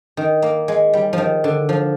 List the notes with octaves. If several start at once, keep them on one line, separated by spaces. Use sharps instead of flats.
D#3
A#3
G#3
G3
D#3 F3
D3
F3